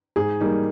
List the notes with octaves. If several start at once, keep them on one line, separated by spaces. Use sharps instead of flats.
G#2 G#4
G3 A#3 D#4